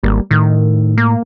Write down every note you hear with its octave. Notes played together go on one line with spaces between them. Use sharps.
G#1 G3 A#3
A2 D#3 A3
A#3